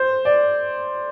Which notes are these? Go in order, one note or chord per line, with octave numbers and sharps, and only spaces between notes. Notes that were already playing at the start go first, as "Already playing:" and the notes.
Already playing: C5
D5